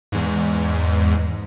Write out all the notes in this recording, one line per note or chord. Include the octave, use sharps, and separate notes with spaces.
E2 G#2